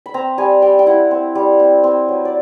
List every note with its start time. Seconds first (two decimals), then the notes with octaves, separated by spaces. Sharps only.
0.06 B5
0.14 C4 A#5
0.38 G3 G#5
0.62 G3 G5
0.79 G5
0.86 E4 F#5
1.11 C4
1.35 G3
1.60 C4
1.84 C4
2.08 F#3
2.25 D5